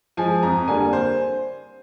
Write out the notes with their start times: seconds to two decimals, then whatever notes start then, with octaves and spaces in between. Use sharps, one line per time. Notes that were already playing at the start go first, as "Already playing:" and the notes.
0.17 F3 G#3 G#5
0.43 F2 A#5
0.67 D3 G3 A#3 G#5
0.93 C5